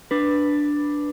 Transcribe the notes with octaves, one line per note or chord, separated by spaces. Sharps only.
D4 B4